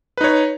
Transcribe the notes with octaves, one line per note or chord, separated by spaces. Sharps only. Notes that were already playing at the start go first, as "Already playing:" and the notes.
D#4 B4 C#5